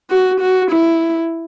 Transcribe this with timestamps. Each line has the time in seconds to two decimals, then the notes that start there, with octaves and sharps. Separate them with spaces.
0.10 F#4
0.41 F#4
0.72 E4